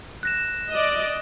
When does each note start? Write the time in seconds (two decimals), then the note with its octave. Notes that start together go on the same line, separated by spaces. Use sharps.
0.23 F#6 A#6 E7
0.70 D5 D#5